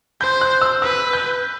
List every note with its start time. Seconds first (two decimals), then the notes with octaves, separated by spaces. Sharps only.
0.21 C5 G6
0.41 F#6
0.62 E6
0.82 B4 E6
1.13 G6